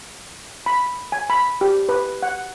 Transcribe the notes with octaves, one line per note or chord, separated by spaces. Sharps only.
B5
G#5
B5
G4
B4
F#5